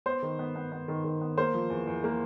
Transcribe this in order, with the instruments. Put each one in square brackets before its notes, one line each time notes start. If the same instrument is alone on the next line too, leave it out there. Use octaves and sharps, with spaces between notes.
[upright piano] B3 C5
D#3
B3
B3
B3
D#3
D#3
B3
A#3 C5
F3
E2
E2
A#3